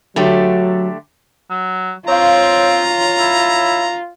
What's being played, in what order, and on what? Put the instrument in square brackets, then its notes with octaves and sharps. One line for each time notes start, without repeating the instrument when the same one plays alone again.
[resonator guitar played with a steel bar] D3 A3 G4 [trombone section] F#3
[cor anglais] F#3
[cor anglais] C4 [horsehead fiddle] F4 [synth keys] C#5 F5 [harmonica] A#5
[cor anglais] E4